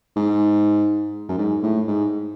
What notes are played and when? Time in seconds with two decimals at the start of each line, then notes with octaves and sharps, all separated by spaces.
0.16 G#2
1.29 F#2
1.38 G#2
1.63 A2
1.87 G#2